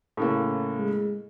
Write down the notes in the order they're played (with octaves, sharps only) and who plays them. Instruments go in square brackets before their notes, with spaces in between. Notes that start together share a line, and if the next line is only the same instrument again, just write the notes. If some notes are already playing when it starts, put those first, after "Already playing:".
[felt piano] A2 C#3 A#3
[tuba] G#3